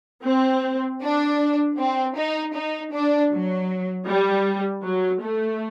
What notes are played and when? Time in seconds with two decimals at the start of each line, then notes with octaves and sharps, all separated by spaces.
0.24 C4
1.01 D4
1.78 C4
2.16 D#4
2.54 D#4
2.92 D4
3.31 F#3
4.06 G3
4.83 F#3
5.21 A3